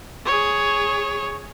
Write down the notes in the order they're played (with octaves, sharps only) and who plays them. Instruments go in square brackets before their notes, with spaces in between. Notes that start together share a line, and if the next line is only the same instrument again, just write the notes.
[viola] G#4 C#5